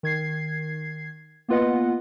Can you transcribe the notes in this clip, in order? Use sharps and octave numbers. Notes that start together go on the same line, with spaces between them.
D#3 G#6 C7
A#3 B3 F4 B4 D#5 F#5